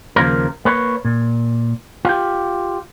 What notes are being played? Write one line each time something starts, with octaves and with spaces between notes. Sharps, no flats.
D#2 C#3 F3 A#3 A#4
A#3 B4 C#5
A#2
F4 G4